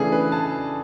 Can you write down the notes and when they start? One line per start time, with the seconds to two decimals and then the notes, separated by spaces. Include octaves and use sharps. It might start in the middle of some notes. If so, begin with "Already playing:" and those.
Already playing: C#3 E3 A3 D4 G#4
0.12 B4
0.32 A5